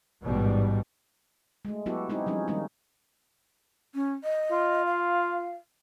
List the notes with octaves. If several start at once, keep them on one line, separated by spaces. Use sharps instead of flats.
A1 G#2 B2 G3
G#3 A3
F#3 B3 E4 F#4 G4 A4
G#3 C4 D#4 E4 G4 G#4
F3 G3 C#4 D#4
D#3 G3 G#3 A#3 C#4 D#4
C#4
D#5
F4
F5